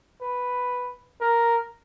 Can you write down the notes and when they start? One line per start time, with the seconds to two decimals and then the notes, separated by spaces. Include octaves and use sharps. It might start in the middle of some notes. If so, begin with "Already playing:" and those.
0.21 B4
1.21 A#4